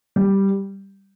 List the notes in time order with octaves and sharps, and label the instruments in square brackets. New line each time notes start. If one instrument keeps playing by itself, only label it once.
[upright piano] G3